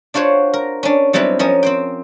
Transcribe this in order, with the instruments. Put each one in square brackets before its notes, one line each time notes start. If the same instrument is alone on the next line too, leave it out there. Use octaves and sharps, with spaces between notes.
[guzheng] D4 F4 F#4 C5 C#5
A#4
C#4 D4
F#3 G3 B3 C4 E4 B4
F3 C#4 A#4 D#5
C4 C5 G5